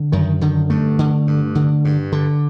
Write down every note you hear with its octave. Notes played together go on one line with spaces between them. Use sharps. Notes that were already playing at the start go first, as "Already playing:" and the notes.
Already playing: D3
F#2 D#3
D3 D#3
G2 A3
D3
G2
D3
G2
D3